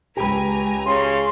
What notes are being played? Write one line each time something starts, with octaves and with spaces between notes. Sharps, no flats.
C#2 G4 B4 G#5 A#5
C#3 C6